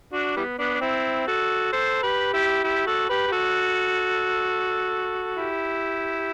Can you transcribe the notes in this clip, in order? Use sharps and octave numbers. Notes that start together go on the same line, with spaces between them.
D4 F#4
E3 G3 B3
B3 D4
D4
C4 E4
F#4 A4
A4 C5
G4 B4
E4 G4
E4 G4
F#4 A4
G4 B4
G4
F#4 A4
E4 G4